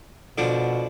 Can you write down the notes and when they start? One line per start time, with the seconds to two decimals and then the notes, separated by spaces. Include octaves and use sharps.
0.38 B2 D3 F3 D4